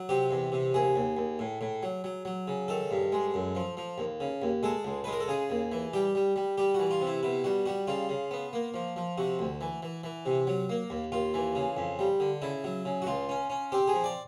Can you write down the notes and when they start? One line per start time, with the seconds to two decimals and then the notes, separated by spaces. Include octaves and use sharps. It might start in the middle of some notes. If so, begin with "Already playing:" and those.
Already playing: F#3
0.09 C3 G4
0.31 E2
0.52 C3
0.74 D#2 G#4
0.96 D#2
1.17 D#2
1.39 A2
1.61 A2
1.83 F#3
2.04 F#3
2.25 F#3
2.48 C#3
2.68 D#3 A4
2.91 G2
3.12 G#3
3.34 F#2
3.55 F3
3.77 F3
3.98 D#2
4.20 C#3
4.42 D#2
4.63 G#3 A4
4.85 C#2
5.04 G#3 B4
5.12 A#4
5.20 A4
5.28 C#3 G#4
5.50 D#2
5.72 E3
5.93 G3 G4
6.15 G3
6.36 G3
6.58 G3 G4
6.74 E3 F#4
6.91 F4
7.01 C3
7.07 E4
7.23 B2 E4
7.44 G3 F#4
7.66 G3 F#4
7.87 C#3 F4
8.09 C#3
8.31 B3
8.53 A#3
8.74 F3
8.96 F3
9.18 C3 F#4
9.39 D2
9.61 E3
9.83 E3
10.04 E3
10.26 C3
10.47 F#3
10.69 A#3
10.90 D#2
11.12 D#2 F4
11.34 E3
11.55 C#3
11.77 F2
11.99 G3
12.20 D3
12.42 C#3 E4
12.64 F#3
12.85 C#3
13.02 F#4
13.06 C#2 F4
13.29 C#4
13.50 C#4
13.72 C4 G4
13.87 G#4
13.93 F3
14.04 D5